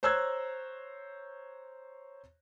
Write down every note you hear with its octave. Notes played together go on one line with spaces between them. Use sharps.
C5 C#5 A#5 E6 F#6 G#6